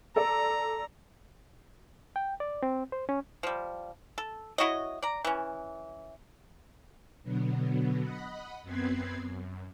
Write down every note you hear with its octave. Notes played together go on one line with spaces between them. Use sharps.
A4 D5 A#5
G5
D5
C4
C5
C#4
F3 G3
A4
E4 F#4 C#5 D#5
D5 A#5
E3 C#4
B2 D3 F#3 B3
D#5 F#5 B5
F#2 B3 C4 B4 G#6 C7
F#2